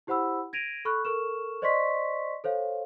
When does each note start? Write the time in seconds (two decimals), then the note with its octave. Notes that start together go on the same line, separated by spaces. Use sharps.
0.07 E4 G4 C5 F#5 B5 E6
0.53 G#6 A#6 D7 D#7 F7
0.85 A4 B5 C#6 F6 F#6
1.05 A4 A#4 C#6 F6 E7
1.62 C5 D5 D#5 C6 C#6 B6
2.44 A4 C5 C#5 F5